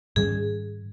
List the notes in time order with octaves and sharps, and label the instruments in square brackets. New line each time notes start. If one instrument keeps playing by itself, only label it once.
[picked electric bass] G#2 D#3 G3 C#4 [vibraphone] G#4